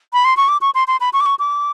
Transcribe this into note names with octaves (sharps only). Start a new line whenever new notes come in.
B5
C6
C#6
D6
C#6
C6
C6
B5
C#6
D6
C#6
D6